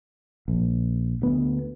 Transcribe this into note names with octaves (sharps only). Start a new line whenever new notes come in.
A#1
D2 B3